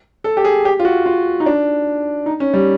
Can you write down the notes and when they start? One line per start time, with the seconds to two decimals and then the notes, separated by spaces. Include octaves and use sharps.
0.24 A4
0.37 G4
0.45 G#4
0.65 G4
0.80 F4
0.85 F#4
1.06 F4
1.40 D#4
1.46 D4
2.26 D#4
2.40 C#4
2.54 G3